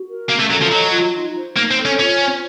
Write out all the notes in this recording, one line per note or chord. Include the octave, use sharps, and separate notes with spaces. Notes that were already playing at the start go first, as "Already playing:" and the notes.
Already playing: F#4
A#4
A#3 C#4
A3
F#3 A4
F3
F#3 D#5
F4
D#4
C5
A#3 D#4
C4
A4
C#4
C#4 F4
C5